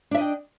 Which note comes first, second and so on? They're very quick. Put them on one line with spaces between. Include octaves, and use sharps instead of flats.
D4 E5 D#5 G5